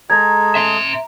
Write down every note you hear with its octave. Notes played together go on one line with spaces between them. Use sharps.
G#3 G#4 A4 A#5 G#6
E5 C6